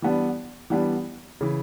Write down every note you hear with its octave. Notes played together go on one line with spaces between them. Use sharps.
E3 G3 B3 D4
E3 G3 B3 D4
C#3 E3